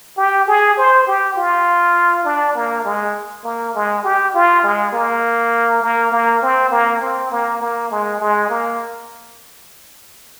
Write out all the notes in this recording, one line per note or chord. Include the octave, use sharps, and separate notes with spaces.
G4
G#4
C5
G4
F4
D4
A#3
G#3
A#3
G#3
G4
F4
G#3
A#3
A#3
A#3
C4
A#3
C4
A#3
A#3
G#3
G#3
A#3